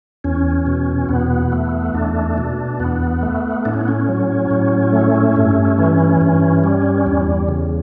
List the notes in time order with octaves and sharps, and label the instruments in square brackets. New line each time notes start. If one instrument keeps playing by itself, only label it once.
[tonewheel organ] E2 C#4
B2
E2 B3
A3
E2 D4
B2
E2 B3
A3
A2 D4
C#4
B3
C#4
F#3
A2
A3
G2
E3
G2
G3
E2
C#3